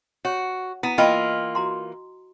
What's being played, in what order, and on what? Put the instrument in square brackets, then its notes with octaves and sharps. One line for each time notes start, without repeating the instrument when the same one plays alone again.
[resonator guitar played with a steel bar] F#4 [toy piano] C#5
[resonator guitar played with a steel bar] B3 [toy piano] E4 A#5
[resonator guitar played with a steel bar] E3 A#3 F4 [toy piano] D#5 G5 B5
[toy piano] F#4 A#5 C6